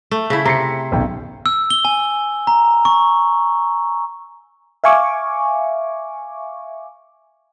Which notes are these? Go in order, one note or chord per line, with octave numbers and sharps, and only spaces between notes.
A3
C#3 E4
C3 A#5 C7 C#7
D#1 B1 G5
E6
G7
G#5
A#5
C#6
E5 F5 G#5 C#6 D6